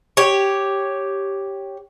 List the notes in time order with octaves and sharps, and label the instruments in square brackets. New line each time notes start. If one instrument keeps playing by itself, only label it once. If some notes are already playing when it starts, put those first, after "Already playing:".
[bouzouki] G4 C#5